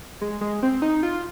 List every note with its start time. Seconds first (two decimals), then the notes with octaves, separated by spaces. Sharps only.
0.21 G#3
0.41 G#3
0.63 C4
0.82 D#4
1.03 F4